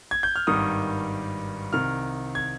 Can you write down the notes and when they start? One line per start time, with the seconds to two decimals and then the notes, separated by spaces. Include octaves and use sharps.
0.11 G#6
0.23 G6
0.36 F6
0.47 G#1 G2 D#3 G3 D#6
1.72 C2 C3 D#3 F6
2.35 G#6